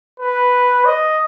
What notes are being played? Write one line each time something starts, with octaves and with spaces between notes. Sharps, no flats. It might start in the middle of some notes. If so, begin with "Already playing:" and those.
B4
D#5